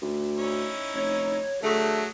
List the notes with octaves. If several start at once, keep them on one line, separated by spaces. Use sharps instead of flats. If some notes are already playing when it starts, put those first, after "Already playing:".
D2
C#4 D#4 E4
F1 C#5
D3 F#3 A3 G#4